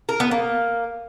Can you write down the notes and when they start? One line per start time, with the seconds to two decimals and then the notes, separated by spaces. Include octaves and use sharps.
0.09 A#4
0.20 B3
0.31 A#3